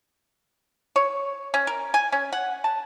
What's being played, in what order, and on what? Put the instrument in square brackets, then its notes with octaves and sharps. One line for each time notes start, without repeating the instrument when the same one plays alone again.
[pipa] C#5
C#4
A#4
G#5
C#4
F#5
A5